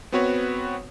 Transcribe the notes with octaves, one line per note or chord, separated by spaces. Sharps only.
B3 C4 F#4 B4 C#5